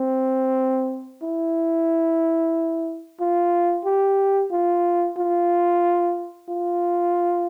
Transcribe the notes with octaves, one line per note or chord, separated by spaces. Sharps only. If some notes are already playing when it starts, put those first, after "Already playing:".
Already playing: C4
E4
F4
G4
F4
F4
F4